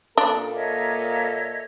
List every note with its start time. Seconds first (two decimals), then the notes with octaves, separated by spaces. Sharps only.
0.18 A#2 A#3 D4 A4
0.54 C#5 D#5 E5